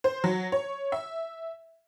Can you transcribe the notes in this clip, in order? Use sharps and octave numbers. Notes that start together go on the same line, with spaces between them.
C5
F#3
C#5
E5